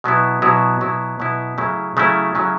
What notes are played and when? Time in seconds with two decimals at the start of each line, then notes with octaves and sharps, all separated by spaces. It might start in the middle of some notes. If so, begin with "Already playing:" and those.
0.04 B2 F#3 B3 E4
0.42 B2 F#3 B3 E4
0.81 B2 F#3 B3 E4
1.19 B2 F#3 B3 E4
1.58 C#3 F#3 A3 C#4 E4
1.97 C#3 F#3 A3 C#4 E4
2.35 C#3 F#3 A3 C#4 E4